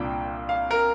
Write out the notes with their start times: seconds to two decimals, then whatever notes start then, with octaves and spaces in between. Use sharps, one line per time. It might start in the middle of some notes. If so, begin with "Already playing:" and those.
Already playing: C2 A#2 A#3 D4 F4 G5
0.49 F5
0.71 A#4